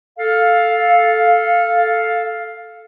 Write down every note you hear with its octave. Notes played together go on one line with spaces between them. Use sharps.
A4 F5